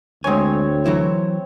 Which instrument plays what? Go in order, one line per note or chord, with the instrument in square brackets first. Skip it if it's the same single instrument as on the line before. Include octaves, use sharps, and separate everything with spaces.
[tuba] D2 [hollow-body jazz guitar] G#3 G#5 [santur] C4 C#5
[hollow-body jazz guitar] E3 F#3 E4